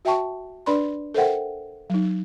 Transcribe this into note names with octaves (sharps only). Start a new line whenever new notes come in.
F#4 E5 G5 A5 C#6
D4 B4 D5 B5 C6
A4 A#4 C5 E5 F#5 G5
F#3 D#4